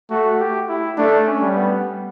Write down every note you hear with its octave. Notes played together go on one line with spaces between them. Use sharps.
A3 F#4
G4
E4
A3 D4
C#4
G3
B3